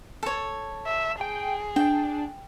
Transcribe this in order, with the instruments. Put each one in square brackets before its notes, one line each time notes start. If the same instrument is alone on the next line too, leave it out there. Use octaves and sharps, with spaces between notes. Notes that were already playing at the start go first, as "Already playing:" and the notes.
[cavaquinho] A4 C#5
[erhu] E5
[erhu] G#4 [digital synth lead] G5
[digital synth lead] D4 [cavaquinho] G5